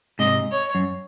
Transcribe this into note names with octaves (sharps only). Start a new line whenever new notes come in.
G#2 C3 D#5
C#5
F#2